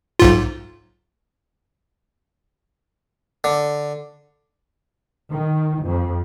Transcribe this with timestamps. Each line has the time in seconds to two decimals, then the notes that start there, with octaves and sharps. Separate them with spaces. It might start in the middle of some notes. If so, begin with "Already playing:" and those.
0.19 B1 G#2 F4
3.44 D3
5.32 D#3
5.85 F2